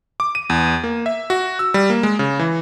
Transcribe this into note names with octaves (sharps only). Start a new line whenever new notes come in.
D6
D#7
E2
A#3
E5
F#4
E6
G3
A#3
G#3
C#3
E3